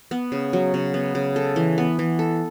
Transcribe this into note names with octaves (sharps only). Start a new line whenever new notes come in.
B3
C#3
F#3
C#3
B3
C#3
A4
E3
B3
E3
A4